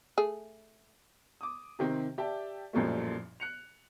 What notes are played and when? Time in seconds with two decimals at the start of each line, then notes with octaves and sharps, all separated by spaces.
0.17 A3 G#4
1.41 D6 D#6
1.79 C3 D#3 C4 G4
2.18 G4 D5 E5 G5 A5
2.73 A1 F#2 A#2 F3 G3 A3
3.40 F#6 C#7 F7